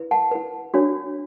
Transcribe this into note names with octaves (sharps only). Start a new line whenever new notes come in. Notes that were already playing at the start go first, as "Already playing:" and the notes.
Already playing: E4 B4
F#5 A5
E4 B4
D4 F#4 C#5